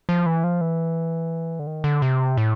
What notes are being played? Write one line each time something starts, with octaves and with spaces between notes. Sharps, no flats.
F3
E3
F3
E3
D3
D#3
D3
C3
A2